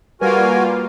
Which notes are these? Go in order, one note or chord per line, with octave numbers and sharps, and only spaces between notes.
G3 A#3 F4 F#4 A#4 B4 G#5